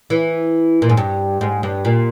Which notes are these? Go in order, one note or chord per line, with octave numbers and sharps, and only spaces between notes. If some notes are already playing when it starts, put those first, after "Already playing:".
E3
A#2
G#2
G2
G#2
G2
A#2